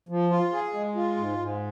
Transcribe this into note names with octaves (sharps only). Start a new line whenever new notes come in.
F3
F4
G#4
G#3
F4
G#2
G#2